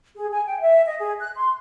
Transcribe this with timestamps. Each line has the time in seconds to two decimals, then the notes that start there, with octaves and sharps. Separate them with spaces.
0.15 G#4
0.32 G#5
0.47 G5
0.61 E5
0.87 D#5
0.99 G#4
1.19 F#6
1.35 C6